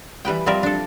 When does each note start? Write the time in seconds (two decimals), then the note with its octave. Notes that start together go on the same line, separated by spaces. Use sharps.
0.25 E3 G3 B4 G5
0.46 F3 G3 C4 A#4 D5 E5
0.63 D4 A4